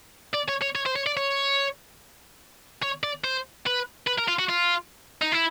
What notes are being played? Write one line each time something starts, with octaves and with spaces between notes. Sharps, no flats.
D5
C#5
C#5
C#5
C5
C#5
D5
C#5
C#5
D5
C5
B4
B4
A#4
F4
F#4
F4
D#4
E4